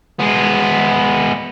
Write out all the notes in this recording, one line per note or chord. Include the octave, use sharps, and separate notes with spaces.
G#3 B3